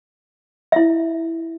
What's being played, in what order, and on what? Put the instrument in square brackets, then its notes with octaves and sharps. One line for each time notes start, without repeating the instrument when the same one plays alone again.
[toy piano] E4 E5